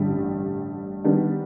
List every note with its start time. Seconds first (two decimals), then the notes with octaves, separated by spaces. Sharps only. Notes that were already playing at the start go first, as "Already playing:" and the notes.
Already playing: A1 G2 D3 G3
1.04 D#3 G3 B3 D4